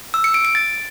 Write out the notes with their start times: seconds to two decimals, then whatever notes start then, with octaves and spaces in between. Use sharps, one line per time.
0.14 E6
0.24 C#7
0.34 D7
0.45 D7
0.55 A6